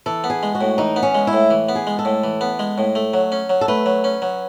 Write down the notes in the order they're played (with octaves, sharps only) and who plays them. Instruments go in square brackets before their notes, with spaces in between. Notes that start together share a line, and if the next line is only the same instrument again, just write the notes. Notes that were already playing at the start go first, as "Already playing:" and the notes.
[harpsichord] E3 [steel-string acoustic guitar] A4
[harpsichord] B3
[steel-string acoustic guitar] G#4
[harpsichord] G#3
[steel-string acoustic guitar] F#4
[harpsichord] A2
[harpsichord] E3 [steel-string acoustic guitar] D#4
[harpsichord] B3
[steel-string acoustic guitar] C#4
[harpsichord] G#3
[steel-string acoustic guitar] E4
[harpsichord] A2
E3
B3
[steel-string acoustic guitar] G#4
[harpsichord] G#3
[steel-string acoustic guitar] A4
[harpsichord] A2
E3
B3
G#3
A2
A3
F#3
C#4
F#3
[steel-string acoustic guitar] A4
[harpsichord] A3 [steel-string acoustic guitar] B4
[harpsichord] F#3
C#4
F#3